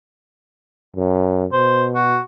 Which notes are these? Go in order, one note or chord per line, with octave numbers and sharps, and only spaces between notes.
F#2
B2 C5
F#4